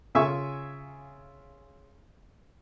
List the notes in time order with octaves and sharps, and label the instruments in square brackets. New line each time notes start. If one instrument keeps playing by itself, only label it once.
[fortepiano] C#3 F4 E5 G#5 C#6 E6